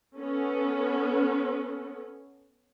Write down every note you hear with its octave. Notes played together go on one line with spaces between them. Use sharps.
B3 C#4 A4